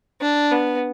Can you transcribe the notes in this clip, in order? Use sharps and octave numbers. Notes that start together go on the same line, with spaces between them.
D4
B3